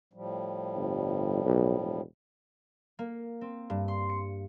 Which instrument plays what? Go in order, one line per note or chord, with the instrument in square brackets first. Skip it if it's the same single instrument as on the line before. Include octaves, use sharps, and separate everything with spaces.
[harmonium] A2 F3 G3
[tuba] G1
B1
E1
[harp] A#3
C4
G2
C6
C#7